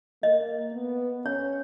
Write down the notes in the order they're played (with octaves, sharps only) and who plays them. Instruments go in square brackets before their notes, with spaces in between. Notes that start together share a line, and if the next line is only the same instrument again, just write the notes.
[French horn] A#3 [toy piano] D#5
[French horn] B3
[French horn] C#4 [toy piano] C#5